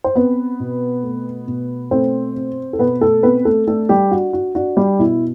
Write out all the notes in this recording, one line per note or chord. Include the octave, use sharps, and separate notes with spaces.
C5
B3 C4 B4
B2
A3
B2
A3 C4 C5
C4
A4
B2 B3 B4
A3 A4
B3 C4 B4
A3 A4
A3 D4 A4
G3 G4
D4 F#4
F#4
D4 F#4
G3 G4
B2 E4